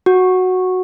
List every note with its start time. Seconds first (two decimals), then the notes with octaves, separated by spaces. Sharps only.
0.06 F#4